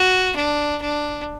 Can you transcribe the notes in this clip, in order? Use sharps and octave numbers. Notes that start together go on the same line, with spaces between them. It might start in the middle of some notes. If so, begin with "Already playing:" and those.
Already playing: F#4
D4
D4